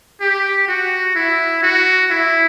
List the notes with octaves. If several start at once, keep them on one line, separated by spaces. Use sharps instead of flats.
G4
F#4
E4
F#4
E4